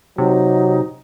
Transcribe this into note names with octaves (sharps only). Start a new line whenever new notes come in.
C3 F#3 D#4